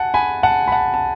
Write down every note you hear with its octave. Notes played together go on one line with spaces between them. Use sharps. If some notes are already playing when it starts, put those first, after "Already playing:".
Already playing: F#5 G#5 A5
G#5 B5
F#5 A5
B5
F#5 A5
A5